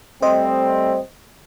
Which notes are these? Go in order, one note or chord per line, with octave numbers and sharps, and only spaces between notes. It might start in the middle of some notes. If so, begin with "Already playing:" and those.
G3 A3 C4 C5 D#5